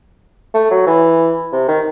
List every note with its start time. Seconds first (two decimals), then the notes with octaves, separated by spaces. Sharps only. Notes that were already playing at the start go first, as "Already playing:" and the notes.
0.54 A3
0.71 F#3
0.87 E3
1.52 C3
1.68 D#3